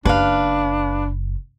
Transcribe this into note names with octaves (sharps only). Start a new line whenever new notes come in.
F#1 D4 B4 F5